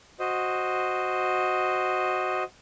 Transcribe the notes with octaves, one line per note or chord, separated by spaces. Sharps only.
F#4 C5 D#5